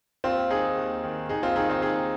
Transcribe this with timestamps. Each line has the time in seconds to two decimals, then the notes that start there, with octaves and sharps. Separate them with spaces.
0.24 D#2 C4 F4
0.50 D#3 D#4 G#4
0.77 D#2
1.04 D#3
1.29 D#2 D#4 G#4
1.43 C4 F4
1.56 D#3 D#4 G#4
1.69 C4 F4
1.82 D#2 D#4 G#4